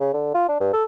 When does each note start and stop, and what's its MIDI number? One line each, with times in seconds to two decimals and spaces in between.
0.01 0.13 49
0.13 0.31 50
0.35 0.48 65
0.49 0.56 62
0.60 0.72 43
0.73 0.84 69